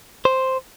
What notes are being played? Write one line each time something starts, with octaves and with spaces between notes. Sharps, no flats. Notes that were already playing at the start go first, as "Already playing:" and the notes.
C5